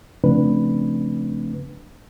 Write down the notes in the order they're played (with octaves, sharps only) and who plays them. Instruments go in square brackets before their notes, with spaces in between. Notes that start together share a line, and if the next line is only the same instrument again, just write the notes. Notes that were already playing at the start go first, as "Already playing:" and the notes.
[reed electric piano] C#3 F3 A3 C4 D4 B4